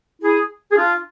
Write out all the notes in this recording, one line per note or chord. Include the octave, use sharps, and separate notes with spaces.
E4 G#4
G#4
D4 F4